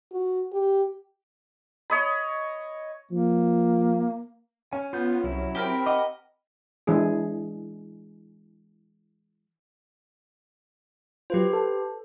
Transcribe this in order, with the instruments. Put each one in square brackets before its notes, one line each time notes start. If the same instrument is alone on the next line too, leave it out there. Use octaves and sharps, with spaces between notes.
[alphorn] F#4
G4
[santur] C#5 D#5 B5
[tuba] F3 [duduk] A#3
[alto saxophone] C#4 [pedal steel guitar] G#5
[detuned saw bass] B3 [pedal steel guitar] F4 G6
[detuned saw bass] C2 [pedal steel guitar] F#3 E4
[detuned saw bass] C4 [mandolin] G4 A#4 B5
[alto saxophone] D#5 [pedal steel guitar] F#5 D6
[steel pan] E3 G#3 D4 G#4
[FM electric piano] F#3 F4 [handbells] G4 B4 C5
[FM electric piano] A4